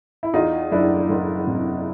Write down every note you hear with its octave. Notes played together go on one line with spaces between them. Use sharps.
E4
E2 D#4 F4
F#1 D4 E4
F#1
C3